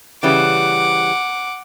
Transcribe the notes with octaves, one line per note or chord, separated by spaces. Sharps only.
C#3 E3 G3 F#5 D6